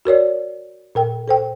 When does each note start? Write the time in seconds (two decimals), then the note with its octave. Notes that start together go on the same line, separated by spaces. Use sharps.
0.05 F#4 A#4 C#5 D5
0.95 A#2 A#4 G5
1.28 A4 C5 G5